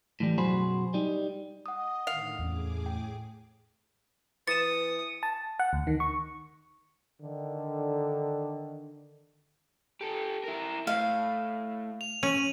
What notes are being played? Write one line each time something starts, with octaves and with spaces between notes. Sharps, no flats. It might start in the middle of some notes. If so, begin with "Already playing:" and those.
A2 E3 G3
B1 F#2 F#4 G#4 C5 B5
G3 D#4
D#5 F#5 D#6
A2 D3 D#3 F5
E2 A2 B3 C#4 G#4 D6
G5
E3 D#6 A6 C#7 E7
A5
F#5
D2
D#3
C#6
D3 D#3
G4 A4
E4 A#4
A2 F5
F7
C#4 D#7 F#7